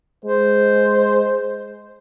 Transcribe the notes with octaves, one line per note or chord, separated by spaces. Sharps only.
G#3 C5